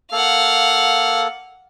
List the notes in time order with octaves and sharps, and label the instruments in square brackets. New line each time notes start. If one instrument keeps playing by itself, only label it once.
[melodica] A#3 A4 [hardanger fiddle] F5 F#5